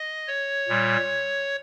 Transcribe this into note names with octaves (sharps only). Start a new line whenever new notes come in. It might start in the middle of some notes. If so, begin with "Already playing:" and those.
Already playing: D#5
C#5
A#2 G3